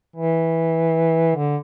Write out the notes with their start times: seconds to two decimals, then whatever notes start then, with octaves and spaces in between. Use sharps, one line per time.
0.16 E3
1.36 D3